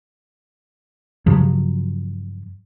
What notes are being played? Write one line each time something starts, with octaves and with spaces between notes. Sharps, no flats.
G2 C#3 F3 F#3